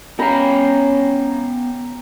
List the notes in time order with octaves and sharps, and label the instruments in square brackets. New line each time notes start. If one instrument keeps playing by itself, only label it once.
[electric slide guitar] B3 F5 [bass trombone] C#4 [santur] G5 A#5 B5